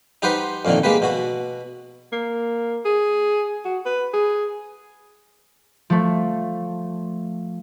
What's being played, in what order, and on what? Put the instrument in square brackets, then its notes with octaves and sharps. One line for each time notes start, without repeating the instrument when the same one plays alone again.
[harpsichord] D#4 G4 B4 C5 F#5 C6
F2 A#2 D3 D#3
G#3 A#3 G4 B4
B2 F#4
[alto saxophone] A#3
G#4
F#4
B4
G#4
[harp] F3 A3